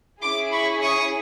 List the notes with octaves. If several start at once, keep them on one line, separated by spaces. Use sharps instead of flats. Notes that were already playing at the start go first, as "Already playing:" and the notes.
C#4 E4 G#4 C6 D6
B5 C#6
C#6 D#6